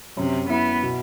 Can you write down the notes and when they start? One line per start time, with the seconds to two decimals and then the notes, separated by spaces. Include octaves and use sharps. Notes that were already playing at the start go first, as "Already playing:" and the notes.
0.17 F#2 C3
0.49 B3 E4
0.83 B2